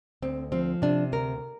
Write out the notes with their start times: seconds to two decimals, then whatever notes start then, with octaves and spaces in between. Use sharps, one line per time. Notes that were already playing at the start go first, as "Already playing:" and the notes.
0.22 D2 C4
0.52 F3 C4
0.82 C3 D4
1.12 D2 A#4